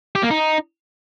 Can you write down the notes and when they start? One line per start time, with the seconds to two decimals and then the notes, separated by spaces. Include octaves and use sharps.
0.15 G4
0.23 A#3
0.31 D#4